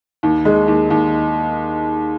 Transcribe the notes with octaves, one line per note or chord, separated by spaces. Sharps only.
D#2
G#3
D#2
D#2